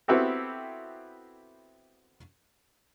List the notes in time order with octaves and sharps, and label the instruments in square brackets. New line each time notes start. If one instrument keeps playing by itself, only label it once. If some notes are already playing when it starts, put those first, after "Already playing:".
[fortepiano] B3 C4 E4 F#4 G4 A4